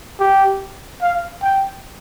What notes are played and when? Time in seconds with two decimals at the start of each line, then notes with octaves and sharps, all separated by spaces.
0.20 G4
1.02 F5
1.43 G5